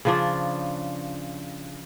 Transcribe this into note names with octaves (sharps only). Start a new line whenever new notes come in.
C#3 F3 D4